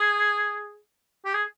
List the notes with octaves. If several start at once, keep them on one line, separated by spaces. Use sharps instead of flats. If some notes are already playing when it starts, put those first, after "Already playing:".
Already playing: G#4
G4
G#4